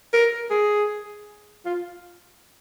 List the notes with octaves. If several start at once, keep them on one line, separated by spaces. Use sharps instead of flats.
A#4
G#4
F4